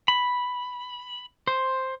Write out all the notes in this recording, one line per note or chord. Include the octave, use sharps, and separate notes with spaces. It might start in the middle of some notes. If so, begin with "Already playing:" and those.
B5
C5